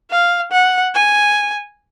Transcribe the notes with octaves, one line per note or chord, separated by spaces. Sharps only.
F5
F#5
G#5